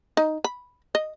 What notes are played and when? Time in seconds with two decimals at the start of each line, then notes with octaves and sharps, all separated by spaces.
0.17 D#4
0.44 B5
0.95 D#5